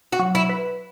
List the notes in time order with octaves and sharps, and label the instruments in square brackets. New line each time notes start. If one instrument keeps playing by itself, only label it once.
[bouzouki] F#4
[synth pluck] F#3
[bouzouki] E4
[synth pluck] B4